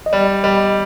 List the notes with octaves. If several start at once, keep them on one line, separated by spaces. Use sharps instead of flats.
D#5
G3 D5
G3 D#5